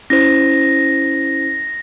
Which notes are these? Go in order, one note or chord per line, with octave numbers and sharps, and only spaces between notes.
C#4 E4 C5 A#6